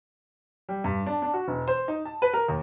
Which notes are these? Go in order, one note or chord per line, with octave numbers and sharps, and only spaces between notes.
G3
G2
D4
D4
F#4
E1
C5
D#4
A5
B4
A#4
D#2